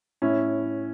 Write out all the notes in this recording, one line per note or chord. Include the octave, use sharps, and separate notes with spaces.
A2 C#4 E4